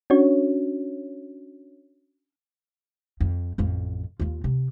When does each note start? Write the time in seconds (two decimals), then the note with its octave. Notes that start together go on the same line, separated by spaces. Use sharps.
0.10 C#4 D4 F#4 C#5
3.21 F2
3.58 A1 F2
4.20 D#2 F4
4.44 C3